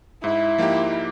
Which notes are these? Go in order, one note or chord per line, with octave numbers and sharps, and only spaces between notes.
G#2 E4
F3 A#3 D#4 G4